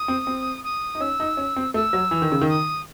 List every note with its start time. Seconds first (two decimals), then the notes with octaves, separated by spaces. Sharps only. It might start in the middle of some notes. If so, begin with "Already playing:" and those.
Already playing: D#6
0.08 C4
0.27 C4
0.64 D#6
0.95 D#4
1.00 C#4 E6
1.20 D#4
1.37 C#4
1.56 C4
1.74 A3 E6
1.93 F#3
2.11 E3
2.22 D#3
2.32 C#3
2.41 D#3
2.48 D#6